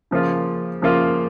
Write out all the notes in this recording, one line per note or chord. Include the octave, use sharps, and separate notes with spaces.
C#3 F3 A#3 F4
C#3 F3 A#3 F4